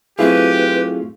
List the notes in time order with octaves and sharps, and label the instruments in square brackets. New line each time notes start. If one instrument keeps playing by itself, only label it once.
[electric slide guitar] F#3 A3 F4 [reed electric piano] C4 E4 G#4 [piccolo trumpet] G4 [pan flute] B4